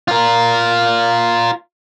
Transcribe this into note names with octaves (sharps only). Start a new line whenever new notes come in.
F4 A#4